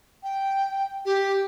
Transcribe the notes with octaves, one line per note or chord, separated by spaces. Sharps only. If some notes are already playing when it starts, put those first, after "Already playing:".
G5
G4